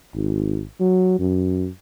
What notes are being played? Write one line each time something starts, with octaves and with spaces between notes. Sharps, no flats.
G#1
F#3
F#2